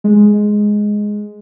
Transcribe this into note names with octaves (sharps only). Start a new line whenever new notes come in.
G#3